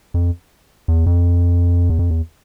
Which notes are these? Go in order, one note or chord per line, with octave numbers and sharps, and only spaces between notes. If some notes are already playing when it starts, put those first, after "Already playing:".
F2
E2
F2
E2
F2
E2